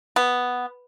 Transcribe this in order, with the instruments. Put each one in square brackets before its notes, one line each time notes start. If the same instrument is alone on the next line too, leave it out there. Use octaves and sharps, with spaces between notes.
[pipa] B3